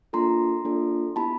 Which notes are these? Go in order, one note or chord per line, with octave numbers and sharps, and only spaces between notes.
A#3 D4 F4 A4 A#5 C6
A#3 D4 F4 A4
B3 E4 G4 A5 B5